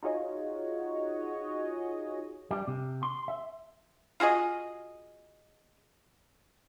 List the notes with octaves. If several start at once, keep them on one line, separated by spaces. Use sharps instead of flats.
D#4 F4 F#4 G#4 C#5 D#5
G3
C3
C6
E5
F4 F#4 G#4 D#5